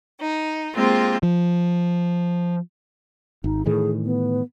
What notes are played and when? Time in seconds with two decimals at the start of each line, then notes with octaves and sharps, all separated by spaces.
0.20 D#4
0.74 G#3 A#3 C4 F4 G4
1.23 F3
3.44 G#1 D#4
3.66 A2 D#3 E3 G#4
4.05 B3